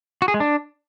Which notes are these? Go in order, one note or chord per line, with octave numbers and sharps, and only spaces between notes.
F#4
G#4
G#3
D4